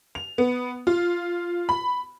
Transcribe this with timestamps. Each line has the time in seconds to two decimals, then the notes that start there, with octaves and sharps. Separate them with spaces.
0.15 F7
0.38 B3
0.87 F4
1.69 B5